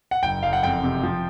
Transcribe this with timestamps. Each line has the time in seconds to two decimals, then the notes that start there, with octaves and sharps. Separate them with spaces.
0.11 F#5
0.23 F#1 G5
0.43 F#1 F5
0.53 F#5
0.63 F2 G5
0.83 C3
1.03 F3